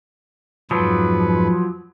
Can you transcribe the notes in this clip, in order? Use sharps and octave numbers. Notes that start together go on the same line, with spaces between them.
F2 G#2 F3 F#3 B4